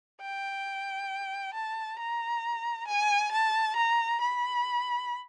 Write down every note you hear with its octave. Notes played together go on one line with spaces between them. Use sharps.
G5
A5
A#5
G#5
A5
A#5
B5